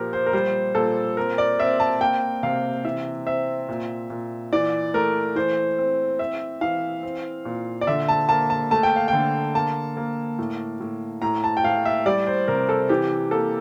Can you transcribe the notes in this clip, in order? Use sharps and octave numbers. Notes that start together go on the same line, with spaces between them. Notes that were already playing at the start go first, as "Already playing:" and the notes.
Already playing: A#2 F3 G4 A#4
C5
A#4
G3 C5
A#2 A4
C4 A#4
D5
C4 E5
A5
A#3 G5
C3 F5
E3 E5
C4 E5
A#2
A#2
E3 D5
A3 A#4
E3 C5
C4
C4 E5
E3 F5
C4
A#2
D5
D3 E5
A5
A#3 A5
A5
A3 A5
G5
F5
D3 G5
A#3 A5
A#3
A2
A2
A2 A#5
A5
G5
A2 F5
E5
G3 D5
C5
C3 A#4
A4
E3 G4
A#3 A4